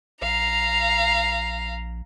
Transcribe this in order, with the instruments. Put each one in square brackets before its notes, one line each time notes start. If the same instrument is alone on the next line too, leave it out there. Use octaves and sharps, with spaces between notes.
[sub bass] A#1 [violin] F5 A#5